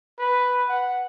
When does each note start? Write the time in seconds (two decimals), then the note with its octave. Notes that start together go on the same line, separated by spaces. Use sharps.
0.19 B4
0.69 F#5